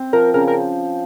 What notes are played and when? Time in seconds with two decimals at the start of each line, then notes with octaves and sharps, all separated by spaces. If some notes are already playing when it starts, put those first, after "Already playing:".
Already playing: C4
0.13 F3 A#4
0.34 C#3 A#4
0.48 A#4